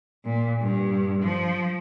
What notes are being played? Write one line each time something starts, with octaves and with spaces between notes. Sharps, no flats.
A#2
G2
F3